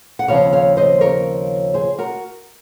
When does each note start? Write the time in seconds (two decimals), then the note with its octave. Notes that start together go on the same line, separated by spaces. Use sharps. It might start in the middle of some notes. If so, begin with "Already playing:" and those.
0.19 F#5
0.28 D#2 C#3 F3 C4 C#5 F5
0.53 C#5 F5
0.77 C5 D#5
1.01 A#4 C#5
1.74 G#4 C5
1.98 F#4 A#4